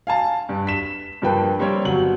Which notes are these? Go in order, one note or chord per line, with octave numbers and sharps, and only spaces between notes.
F5 G#5 A5
G2
B6 E7
G2 F3 A#3 B4 G5
G3 A#3 C4 A#4 C#5
G1 F#3 F#7